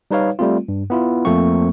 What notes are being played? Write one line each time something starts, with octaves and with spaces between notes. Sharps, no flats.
G3 D#4 B4 C#5 F5
G3 A3 C4 F4
G2
B3 E4 F4
F2 F3 A3 A#3 C4 C#6